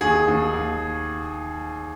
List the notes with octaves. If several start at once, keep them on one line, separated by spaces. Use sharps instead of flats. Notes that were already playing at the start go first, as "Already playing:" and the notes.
D#2 G#4
D#2
D#2